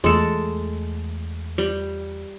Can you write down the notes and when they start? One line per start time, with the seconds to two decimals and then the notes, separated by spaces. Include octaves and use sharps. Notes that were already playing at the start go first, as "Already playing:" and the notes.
0.04 E2 G#3 A3 A4
1.58 G3